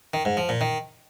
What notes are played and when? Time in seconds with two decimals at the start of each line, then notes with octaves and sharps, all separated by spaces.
0.14 D#3
0.25 G#2
0.37 F3
0.49 A#2
0.61 D#3